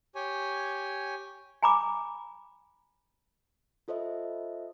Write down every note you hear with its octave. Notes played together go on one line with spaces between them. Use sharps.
G4 C#5 G#5
G#5 A#5 B5 D6
F4 A4 C5 D#5 E5